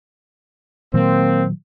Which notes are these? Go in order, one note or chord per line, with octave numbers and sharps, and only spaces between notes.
A#2 D#3 F#3 A#3 C4